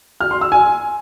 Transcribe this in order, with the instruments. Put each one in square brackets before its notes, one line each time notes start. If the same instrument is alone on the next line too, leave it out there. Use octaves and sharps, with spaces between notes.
[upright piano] F6
C6
E6
G#5